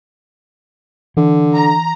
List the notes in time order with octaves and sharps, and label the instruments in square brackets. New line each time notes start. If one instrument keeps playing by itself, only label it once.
[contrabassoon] D3 [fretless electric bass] E3
[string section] A#5